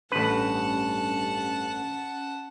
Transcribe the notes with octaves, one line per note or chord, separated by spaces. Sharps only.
A1 G2 C#4 B4 F#5 A5